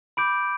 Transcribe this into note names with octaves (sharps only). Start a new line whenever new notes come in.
B5 D6 G6 D7